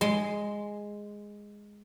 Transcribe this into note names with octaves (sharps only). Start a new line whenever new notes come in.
G#3 C6